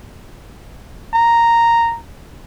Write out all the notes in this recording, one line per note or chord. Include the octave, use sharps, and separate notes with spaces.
A#5